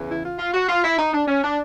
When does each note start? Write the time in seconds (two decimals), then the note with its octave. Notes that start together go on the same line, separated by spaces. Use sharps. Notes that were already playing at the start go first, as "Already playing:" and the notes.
Already playing: E2 C#3 E3
0.10 E4
0.23 F4
0.39 F4
0.54 F#4
0.69 F4
0.84 E4
0.99 D#4
1.14 D4
1.28 C#4
1.44 D4